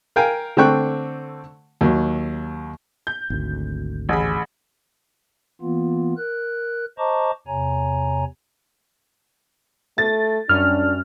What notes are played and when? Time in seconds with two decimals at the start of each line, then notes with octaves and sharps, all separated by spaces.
0.16 A#4 F5 G5 G#5
0.57 D3 A3 C4 G5 C#6 F#6
1.81 D#2 F#3
3.07 G6
3.30 G#1 D2
4.09 A1 G#4 B5
5.61 E3 A#3 B3 F4
6.17 A#4 F#6
6.98 C5 D#5 A5 A#5 C#6 D6
7.47 E2 C3 C#5 G#5 A#5
9.98 A3 A6
10.49 F#2 G3 C#4 D4 F6